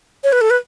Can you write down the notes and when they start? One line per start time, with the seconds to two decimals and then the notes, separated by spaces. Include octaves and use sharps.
0.24 C#5
0.33 B4
0.41 A4
0.50 B4